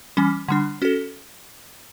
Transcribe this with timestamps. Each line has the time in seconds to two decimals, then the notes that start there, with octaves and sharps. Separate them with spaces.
0.17 E3 G3 C#4
0.48 D3 G3 D4
0.82 C#4 F#4 A4